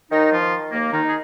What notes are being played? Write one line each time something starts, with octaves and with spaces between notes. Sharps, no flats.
D#2 D#3 D#4
F3 F4
D#3
D#2 A#3
D#3 D#4
D#3 G#4